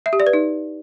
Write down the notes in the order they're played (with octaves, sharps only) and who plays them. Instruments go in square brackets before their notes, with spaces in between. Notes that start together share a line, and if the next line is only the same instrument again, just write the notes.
[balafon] E5
G4
D5
B4
D#4